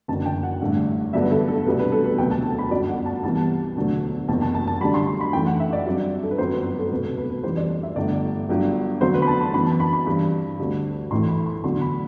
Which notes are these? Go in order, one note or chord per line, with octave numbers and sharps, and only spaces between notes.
F#1 F#2 D3 A5
G5
F#5
A1 G2 D3
G2 D3 F#3 B3 D4 E5
B4
A4
A4
C2 B2 G3 B3 D4 B4
B4
A4
B4
E1 D2 C3 F#3 G5
A5
B5
G1 F#2 F#3 D5
F#5
A5
C2 C3 E3 G3 B3 A5
E1 D2 D3 F#3 A3
F#1 E2 C3 A5
A5
A5
A5
F#2 D3 G3 D4 B5
C6
C6
B5
F#2 E3 A3 G5
F#5
E5
D5
G2 F#3 C4
A4
B4
G1 F#2 F#3 C4 C5
B4
A4
E1 D2 C3 B4
A4
B4
B4
F#2 E3 G3 C5
D5
D5
E5
G1 G2 D3 A3 D4 D5
G1 G2 F#3
E2 D3 F#3 A3 C4 C5
B4
B5
A5
B5
F#2 E3 B3 B5
A5
B5
B5
G2 E3 G3 C4 B5
D2 D3 G3 C4
A1 A2 E3 A3 C6
B5
C6
E2 D3 F#3 C6
B5